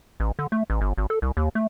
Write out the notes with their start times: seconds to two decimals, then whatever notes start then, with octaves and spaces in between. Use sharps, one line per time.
0.20 A1
0.39 D3
0.52 A3
0.70 A1
0.81 G1
0.98 G#1
1.10 A4
1.22 C2
1.37 D#2
1.55 A3